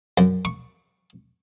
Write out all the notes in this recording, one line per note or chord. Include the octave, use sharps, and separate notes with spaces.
F#2
C#6